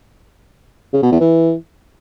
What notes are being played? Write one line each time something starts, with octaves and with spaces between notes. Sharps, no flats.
C#3
B2
E2
E3